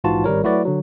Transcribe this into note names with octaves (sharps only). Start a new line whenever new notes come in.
A#1 G#2 E3 F4 F#4 A5
G#1 G3 A#4 C#5
F#3 A3 E4 F#4 B4 D5
D3 F#3